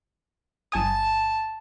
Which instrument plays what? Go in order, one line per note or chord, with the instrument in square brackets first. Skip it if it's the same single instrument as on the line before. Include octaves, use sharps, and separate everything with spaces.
[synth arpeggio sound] G1 G#5 D#6 [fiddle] A5